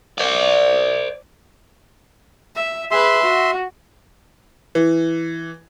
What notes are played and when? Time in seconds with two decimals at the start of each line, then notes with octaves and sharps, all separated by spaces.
0.18 C5 D5
2.55 E5
2.91 G#4 B4 E5 C6
3.23 F#4
4.75 E3